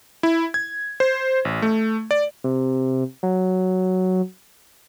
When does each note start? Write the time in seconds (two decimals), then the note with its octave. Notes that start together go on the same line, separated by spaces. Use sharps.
0.23 E4
0.54 G#6
1.00 C5
1.45 A1
1.62 A3
2.11 D5
2.44 C3
3.23 F#3